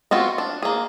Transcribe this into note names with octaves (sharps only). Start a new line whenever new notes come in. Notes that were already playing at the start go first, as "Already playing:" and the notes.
B3 C4 F4 F#4
D4
A#3 G#4